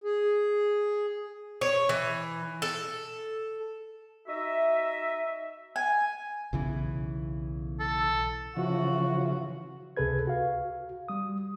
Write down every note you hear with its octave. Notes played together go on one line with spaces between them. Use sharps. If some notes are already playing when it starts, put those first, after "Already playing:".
G#4
C#5
E3
A4
D#4 F#4 D#5 E5
G#5
B1 C#3 E3
A4
C#3 E3 F3 F#4
C#2 C3 G#4 A4 B4 G#6
F#4 F5
G3 D#6